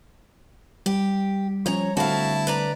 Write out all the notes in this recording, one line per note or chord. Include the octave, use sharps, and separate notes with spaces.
G3 G4
F3 C#4 C#5 A#5
D3 A3 C4 E4 F#4 F5 A5
B4 D5 A#5